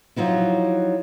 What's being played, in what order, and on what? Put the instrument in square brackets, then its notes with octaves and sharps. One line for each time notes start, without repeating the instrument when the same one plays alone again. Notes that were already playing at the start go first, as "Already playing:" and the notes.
[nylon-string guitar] F3 F#3 D#4 E4